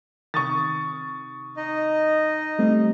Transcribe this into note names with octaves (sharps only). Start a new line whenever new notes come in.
C3 D#3 C#6 D#6 A6
D#4 D#5
G3 A3 C4